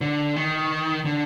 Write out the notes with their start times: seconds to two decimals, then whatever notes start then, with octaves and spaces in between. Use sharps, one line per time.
0.01 D3
0.36 D#3
1.05 D3